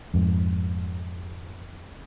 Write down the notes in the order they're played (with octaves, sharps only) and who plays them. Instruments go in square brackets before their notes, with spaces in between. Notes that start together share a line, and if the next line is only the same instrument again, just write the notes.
[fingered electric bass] F2 G#2